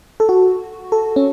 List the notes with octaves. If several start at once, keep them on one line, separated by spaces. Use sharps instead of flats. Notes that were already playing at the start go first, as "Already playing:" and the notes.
A4
F#4
A4
C#4